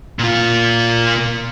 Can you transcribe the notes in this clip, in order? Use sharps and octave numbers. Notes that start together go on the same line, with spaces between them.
A#2 F4